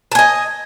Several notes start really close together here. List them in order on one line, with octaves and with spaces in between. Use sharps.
A5 G#5 D#5